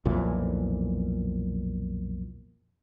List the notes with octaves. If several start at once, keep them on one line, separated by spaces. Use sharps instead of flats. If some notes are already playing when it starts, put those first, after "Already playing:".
B1 F2 A#2 E3